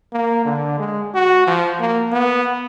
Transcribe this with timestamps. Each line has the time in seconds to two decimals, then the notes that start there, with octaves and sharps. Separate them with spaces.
0.13 A#3
0.45 D3
0.79 G#3
1.15 F#4
1.47 F3
1.80 A#3
2.12 B3